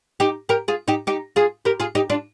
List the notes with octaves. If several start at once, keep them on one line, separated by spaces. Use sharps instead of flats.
D#4 G4
G4 A#4
F4 G#4
D#4 G4
D#4 G4
F4 G#4
G4 A#4
F4 G#4
D#4 G4
D4 F4